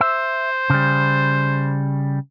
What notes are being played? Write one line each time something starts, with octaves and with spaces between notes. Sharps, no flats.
C5 E5
C#3 G3